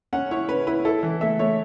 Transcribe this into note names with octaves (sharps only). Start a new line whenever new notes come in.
C#4 F#5
E4 C#5
C#4 B4
E4 B4
E4 A4
E3
A3 E5
A3 C#5